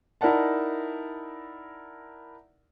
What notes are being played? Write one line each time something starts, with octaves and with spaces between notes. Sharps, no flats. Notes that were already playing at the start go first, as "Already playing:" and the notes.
D#4 E4 A#4 D5 F#5 A5